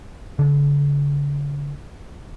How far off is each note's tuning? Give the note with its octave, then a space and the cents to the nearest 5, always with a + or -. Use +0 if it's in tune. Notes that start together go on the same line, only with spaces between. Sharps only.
D3 -45